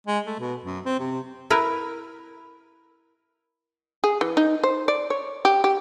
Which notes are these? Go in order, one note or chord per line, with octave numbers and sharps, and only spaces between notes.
G#3
A3
B2
F#2
C4
C3
E4 A#4 B4
G#4
E3
D#4
C5
D5
C#5
G4
G4